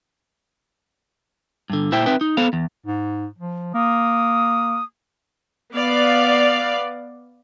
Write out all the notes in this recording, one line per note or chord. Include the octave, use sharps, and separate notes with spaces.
G2 D3
A#2 E4 C5 E5 G5
C4 D#4 B4 E5 G5
D#4
B3 A4 C5 F5
E2
G#2
F3
A#3 D#6
B3 D5 F5